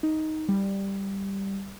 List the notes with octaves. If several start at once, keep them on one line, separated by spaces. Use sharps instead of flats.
D#4
G3